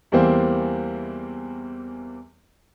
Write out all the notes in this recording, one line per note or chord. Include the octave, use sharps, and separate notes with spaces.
E2 E3 G3 A#3 C4